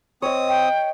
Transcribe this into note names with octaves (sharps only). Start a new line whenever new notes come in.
C4 C#5 D#5 D#6
G5